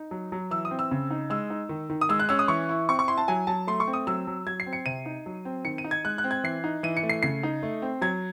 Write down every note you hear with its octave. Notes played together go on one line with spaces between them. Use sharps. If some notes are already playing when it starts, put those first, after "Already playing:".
Already playing: D#4
F#3
F#3
E3 E6
D#6
C4
E6
C#3
D#4
G#3 E6
D#4
D#3
D#3
D#6
G#3 E6
F#6
C#4 E6
D#6
E3 C#6
E4
C4 C#6
C#6
E4 C6
A5
F#3 G#5
F#3 A5
A3 C6
C#6
C4
D#6
F#3 E6
F#3
F#3 G#6
C7
C4
C#7
C3 D#7
D#4
F#3
C4
D#3 C#7
D#7
D#4
G#6
G#3 F#6
F#6
C4
G#6
E3 C7
D#4
E3 D#7
C#7
A3
C7
C#3 C7
D#4
A3
C4
F#3 G#6